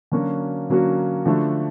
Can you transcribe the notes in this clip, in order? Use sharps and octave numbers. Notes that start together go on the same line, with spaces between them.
D3 F#3 A#3 C#4 F#4
D3 F#3 A#3 C#4 F#4
D3 F3 A3 D4 F#4